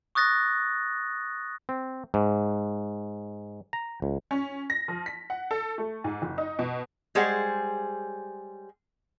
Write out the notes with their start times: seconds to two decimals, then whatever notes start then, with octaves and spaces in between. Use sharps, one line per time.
0.15 C#6 D#6 F#6 A6 A#6
1.69 C4
2.14 G#2
3.73 A#5
4.02 C#2
4.31 C#4
4.70 A#6
4.88 F3
5.06 B6
5.30 F#5
5.51 A4
5.78 A3
6.04 G#2
6.22 F#1
6.38 D#4
6.59 B2
7.15 G3 G#3 G#4 C5 C#5 F#5